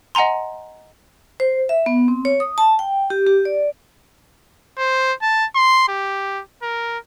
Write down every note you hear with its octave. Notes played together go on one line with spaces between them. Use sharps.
D#5 F#5 G#5 A#5 C6
C5
E5
B3
C4
C#5
D#6
A5
G5
G4
G4
D5
C5
A5
C6
G4
A#4